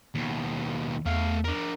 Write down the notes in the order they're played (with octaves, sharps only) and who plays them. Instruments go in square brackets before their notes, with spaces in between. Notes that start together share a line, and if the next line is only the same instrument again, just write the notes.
[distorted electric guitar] D#2 B2
[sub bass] E2 [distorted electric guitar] A3 F5
[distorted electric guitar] D4 A#4